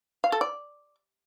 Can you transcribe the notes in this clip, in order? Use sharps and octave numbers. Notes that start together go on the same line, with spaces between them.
F5
A4
D5